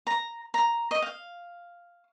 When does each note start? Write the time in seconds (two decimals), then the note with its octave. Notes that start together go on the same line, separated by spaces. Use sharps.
0.07 A#5
0.54 A#5
0.91 D#5
1.02 F5